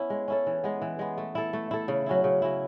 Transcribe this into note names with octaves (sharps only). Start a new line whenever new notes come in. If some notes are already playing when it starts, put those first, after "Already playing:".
Already playing: B3 C#4 E4
G#3
C#4 E4 A4
E3
G#3 B3
E3
G#3 B3
A3
E4 A4
A3
E4 A4
C#3
F#3 C#4 E4
C#3
F#3 C#4 E4